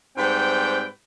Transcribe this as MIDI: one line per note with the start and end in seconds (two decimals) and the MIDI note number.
0.17 0.86 44
0.17 0.86 55
0.17 0.86 60
0.17 0.86 71
0.17 0.86 79